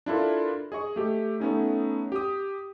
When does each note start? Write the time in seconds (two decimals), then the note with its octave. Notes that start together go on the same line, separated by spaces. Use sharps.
0.06 D4 E4 F4 A4 A#4
0.72 G#4 D#5 C#6
0.96 A3 G4
1.40 A3 B3 C#4 D#4
2.12 G4 D#6